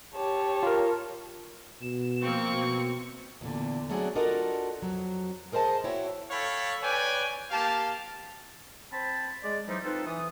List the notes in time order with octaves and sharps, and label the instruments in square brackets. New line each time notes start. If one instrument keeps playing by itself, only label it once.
[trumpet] G4 [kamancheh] C#5 A5
[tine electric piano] F4 A#4
[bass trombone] B2 [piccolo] E7
[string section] F3 A#3 C4 [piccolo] C#6
[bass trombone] B2
[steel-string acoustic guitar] E2 A#2 D3
F#3 A3 C4 D4 F#4 G#4
D4 F4 F#4 A4 A#4 D#5
F2 F#3
G#4 A#4 C5 D#5 A5
E4 F#4 C#5 G5
[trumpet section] A4 C#5 F5 G5 B5
B4 C#5 D5 G5 G#5
A#3 G4 F5 A5
[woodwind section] C4 C5 A5 B5
G#3 D5
E3 F#3 G3 D#4 C5
C4 D#4 F4 A4 B4
E3 D#6